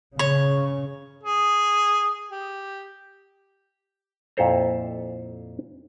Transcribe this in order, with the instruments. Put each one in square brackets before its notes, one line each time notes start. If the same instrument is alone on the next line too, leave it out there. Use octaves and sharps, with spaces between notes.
[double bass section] C#3 [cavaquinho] C#5
[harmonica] G#4
G4
[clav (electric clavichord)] F2 A#2 E4 A4 C5 A#5